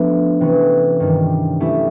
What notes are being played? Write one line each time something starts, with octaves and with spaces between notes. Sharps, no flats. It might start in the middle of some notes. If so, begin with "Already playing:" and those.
Already playing: F3 A3 B3 D4
C3 E3 A3 C#4
G2 D#3 G3
F#3 A3 C#4 E4 G4